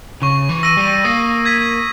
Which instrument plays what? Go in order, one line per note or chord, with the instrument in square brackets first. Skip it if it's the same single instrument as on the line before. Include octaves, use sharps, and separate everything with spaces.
[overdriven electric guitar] C#3 [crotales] C#6
[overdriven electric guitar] E3
[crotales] E6 A#6 D#7
[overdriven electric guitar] G3
[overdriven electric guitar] A#3 [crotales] D#6
[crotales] G#6 B6 D#7